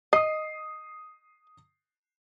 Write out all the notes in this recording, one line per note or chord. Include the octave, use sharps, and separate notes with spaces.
D#5 D#6 C7